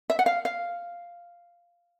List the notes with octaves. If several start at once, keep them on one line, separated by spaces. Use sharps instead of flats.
E5
F#5
F5
F5